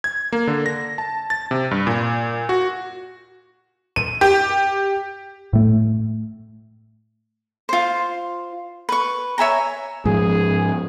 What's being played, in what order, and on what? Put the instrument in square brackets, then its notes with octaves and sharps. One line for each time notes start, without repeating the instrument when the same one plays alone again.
[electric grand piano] G#6
A#3
D3
A#6
A5
A6
C3
G2
A#2
F#4
[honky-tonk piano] D#7
G4
[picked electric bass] A2 A3
[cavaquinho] F4 C5
B4 C#6
C#5 E5 G#5 A#5
[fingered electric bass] G#2 F3 [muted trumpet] G#4